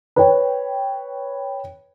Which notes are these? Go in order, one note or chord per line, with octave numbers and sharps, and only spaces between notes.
B4 C#5 G5